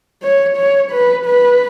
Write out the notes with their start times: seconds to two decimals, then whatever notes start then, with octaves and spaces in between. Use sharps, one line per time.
0.23 C#5
0.57 C#5
0.91 B4
1.26 B4